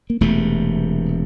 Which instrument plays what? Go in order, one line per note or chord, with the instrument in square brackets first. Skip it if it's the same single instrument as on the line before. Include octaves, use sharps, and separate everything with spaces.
[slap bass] A#3
E1 E2 C3 A3